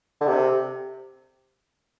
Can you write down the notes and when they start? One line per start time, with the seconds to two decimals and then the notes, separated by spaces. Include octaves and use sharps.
0.21 D3
0.27 C3